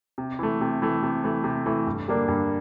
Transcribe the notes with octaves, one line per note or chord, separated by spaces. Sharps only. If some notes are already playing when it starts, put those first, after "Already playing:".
C3
E3 A3
C3
E3 A3
C3
E3 A3
C3
E3 A3
G2
D3 G3 A#3 D4
G2